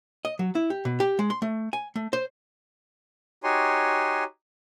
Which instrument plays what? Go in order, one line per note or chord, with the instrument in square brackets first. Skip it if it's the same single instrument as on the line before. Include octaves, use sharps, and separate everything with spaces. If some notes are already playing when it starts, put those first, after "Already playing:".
[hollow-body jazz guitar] D#5
F#3
E4
G4
B2
G4
G#3
C6
A3
G#5
A3
C5
[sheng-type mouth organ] D#4 F#4 G4 C#5 G#5 C6